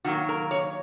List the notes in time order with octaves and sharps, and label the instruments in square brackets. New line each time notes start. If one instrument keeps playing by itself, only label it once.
[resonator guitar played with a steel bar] D#3 F#3 A#3 F#4
A#4
C#5